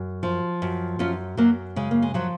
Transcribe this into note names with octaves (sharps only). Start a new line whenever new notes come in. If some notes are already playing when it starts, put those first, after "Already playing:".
Already playing: F#2
F3
F#2
F#2 C#4 F4
F#2 F#3 A#3
C#3 G#3
A#3
G#3
F3 F#3